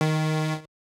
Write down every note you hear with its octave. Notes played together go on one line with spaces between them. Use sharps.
D#3